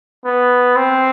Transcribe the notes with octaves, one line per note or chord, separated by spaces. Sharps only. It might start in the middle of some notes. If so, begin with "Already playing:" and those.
B3
C4